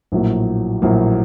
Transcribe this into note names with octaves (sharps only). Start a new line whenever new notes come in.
A#1 A2 F#3 A#3
A#1 A2 F#3 A#3